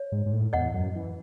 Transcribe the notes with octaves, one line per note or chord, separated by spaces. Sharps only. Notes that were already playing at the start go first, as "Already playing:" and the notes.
Already playing: C#5
G#2
G#2
A2
E2 D#5 F#5
F#2
E3